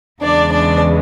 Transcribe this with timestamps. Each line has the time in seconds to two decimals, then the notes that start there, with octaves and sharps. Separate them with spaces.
0.22 E2 C#3 E3 G#3 D4 D5
0.51 D4 D5